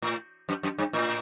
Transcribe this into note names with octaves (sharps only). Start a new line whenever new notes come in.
A2
F#2
F#2
G2
A2